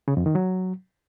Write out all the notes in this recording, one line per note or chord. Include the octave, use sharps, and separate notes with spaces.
C#3
F2
D#3
F#3